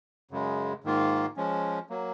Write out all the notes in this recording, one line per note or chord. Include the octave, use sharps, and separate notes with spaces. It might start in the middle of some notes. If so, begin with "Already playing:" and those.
F#2 C#3 G#3
G#2 D#3 A#3 F4
F3 G#3 C#4
F#3 A#3